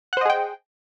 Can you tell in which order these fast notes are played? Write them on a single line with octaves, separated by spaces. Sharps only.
F#5 C5 D#5 G#4 G5